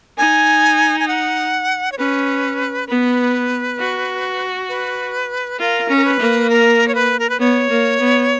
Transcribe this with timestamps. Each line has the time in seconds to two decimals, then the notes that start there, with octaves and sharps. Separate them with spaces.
0.18 D#4 G#5
1.00 G#5
1.08 F#5
1.92 C#5
1.98 C#4 B4
2.88 B3 B4
3.79 F#4
4.69 B4
5.59 F4 A#4
5.89 C#4
5.97 A#4
6.05 B4
6.20 A#3
6.50 A#4
6.88 C#5
6.95 B4
7.19 A#4
7.30 B4
7.39 B3 C#5
7.70 A#3
8.00 B3